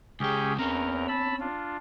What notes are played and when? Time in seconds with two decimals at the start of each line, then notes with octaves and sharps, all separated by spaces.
0.20 C#2 C#4 G4 G#4 G5
0.59 E2 C4 C#4 A#4 A#5
1.08 A5 B5 E6
1.40 D4 F4